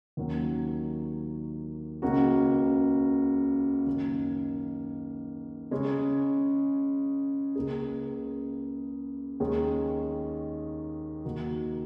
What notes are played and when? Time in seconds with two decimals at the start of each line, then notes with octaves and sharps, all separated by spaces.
0.17 D#2 D#3 F#3 A#3 C#4
2.02 C#2 C#3 A#3 C#4 F#4
3.87 F#2 D#3 A#3 C#4
5.71 C#3 G#3 C#4 G#4
7.55 C#2 C#3 A#3 C#4 G#4
9.40 D#2 D#3 G#3 C#4 G#4
11.25 D#2 D#3 A#3 F#4